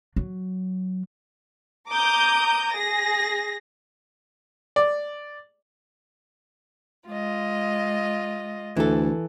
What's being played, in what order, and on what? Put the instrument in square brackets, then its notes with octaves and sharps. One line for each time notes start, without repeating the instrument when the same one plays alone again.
[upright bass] F#3
[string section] A#5 D6 D#6 G6
G#4 A#6
[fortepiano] D5
[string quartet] G#3 F4 D#5
[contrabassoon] D2 [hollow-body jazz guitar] E3 A4